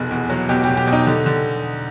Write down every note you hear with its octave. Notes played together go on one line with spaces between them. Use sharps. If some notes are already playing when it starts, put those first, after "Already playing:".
Already playing: F1 B2 G#4
E2
F#3
B2 G4
G4
B2
G4
B2
D#4
D3
D3